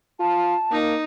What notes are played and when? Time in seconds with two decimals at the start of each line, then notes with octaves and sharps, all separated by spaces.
0.20 F4 A5
0.71 A#3 D#4